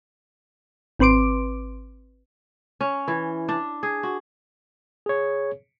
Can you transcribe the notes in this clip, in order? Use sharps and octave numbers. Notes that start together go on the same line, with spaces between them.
G#1 C4 B4 C6 D6 D7
C#4
E3
D4
G#4
F#4
G#4 C#5